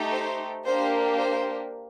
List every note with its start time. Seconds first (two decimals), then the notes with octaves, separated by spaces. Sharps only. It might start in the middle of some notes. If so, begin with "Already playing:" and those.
Already playing: A3 D#4 G4
0.12 C5
0.66 A#3 D4 G4 C5
1.20 C5